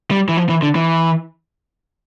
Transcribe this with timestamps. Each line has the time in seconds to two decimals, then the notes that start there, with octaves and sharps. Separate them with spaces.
0.11 G3
0.29 E3
0.37 F3
0.49 E3
0.62 D3
0.75 E3